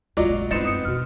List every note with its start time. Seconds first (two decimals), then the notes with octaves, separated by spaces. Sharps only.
0.17 D#2 F#3 G#3 C#4 F4 D5 D#5
0.30 A#1
0.51 F#2 B3 C4 D#4 E4 A6 C#7 E7
0.65 D#6 C#7
0.85 F2 B2 F#4 F6